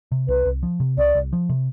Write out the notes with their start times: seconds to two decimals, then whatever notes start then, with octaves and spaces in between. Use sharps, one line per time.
0.12 C3
0.28 C2 B4
0.46 C2
0.63 F3
0.80 C3
0.97 C2 D5
1.15 C2
1.33 F3
1.49 C3